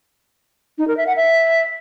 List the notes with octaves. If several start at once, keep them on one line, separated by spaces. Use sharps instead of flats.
D#4
A#4
E5
F#5
E5